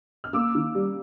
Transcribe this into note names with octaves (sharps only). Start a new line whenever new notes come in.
F6
A#3 D6 E6
D#3
G3